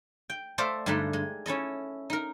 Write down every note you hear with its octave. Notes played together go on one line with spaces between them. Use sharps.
G5
A3 A4 C5 D5 E5 F5
G2 D3 G#3 A3 D4 D#4
G#3
C#4 E4 A4 D#5
D#4 A#4